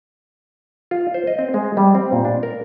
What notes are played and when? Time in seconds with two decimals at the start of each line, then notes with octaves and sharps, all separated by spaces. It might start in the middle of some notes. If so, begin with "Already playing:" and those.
0.91 F4
1.14 C5
1.27 D#5
1.39 C4
1.54 G#3
1.77 G3
1.95 C4
2.12 A#2
2.25 D4
2.43 A#4